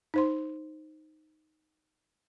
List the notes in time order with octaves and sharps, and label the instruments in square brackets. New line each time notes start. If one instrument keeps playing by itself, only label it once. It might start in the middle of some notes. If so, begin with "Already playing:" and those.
[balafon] D#4 C5 C6